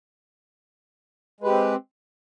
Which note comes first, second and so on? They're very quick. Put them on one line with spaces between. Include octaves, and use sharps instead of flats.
G#3 B4 G4 C4